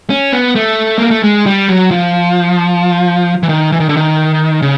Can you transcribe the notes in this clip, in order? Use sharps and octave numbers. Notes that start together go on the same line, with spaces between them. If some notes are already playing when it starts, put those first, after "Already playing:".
C#4
B3
A3
A#3
A3
G#3
G3
F#3
F3
E3
D#3
E3
D#3
D3
D#3
C#3